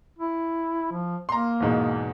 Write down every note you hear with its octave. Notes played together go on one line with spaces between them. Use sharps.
E4
F3
A#3 A#5 C6
E2 G#2 B2